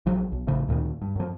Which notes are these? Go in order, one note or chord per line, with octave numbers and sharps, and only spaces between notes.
A#1 F3 F#3
B1
A1 A2 C#3 F3
D2 A#2 D#3
G2
F#2 F3